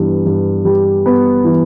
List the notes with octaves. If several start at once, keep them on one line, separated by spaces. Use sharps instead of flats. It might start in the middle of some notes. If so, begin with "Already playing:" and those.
Already playing: G2 E3 B3
G2
G3
B3
E3